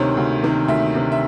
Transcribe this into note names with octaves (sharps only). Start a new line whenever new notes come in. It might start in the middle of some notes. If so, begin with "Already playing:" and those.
Already playing: D2 C3 D#3 C5 C#5
D2
C3 D#3
D2 E5
C3 D#3
E5